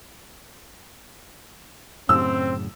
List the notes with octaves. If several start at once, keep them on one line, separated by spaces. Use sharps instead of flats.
F#2 A2 C#3 C4 E6